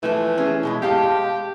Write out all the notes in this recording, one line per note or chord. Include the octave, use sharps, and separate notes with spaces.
E3 F3 A3
C#4 G#4
B2 G#3 E4
G#3 G4 F5 A5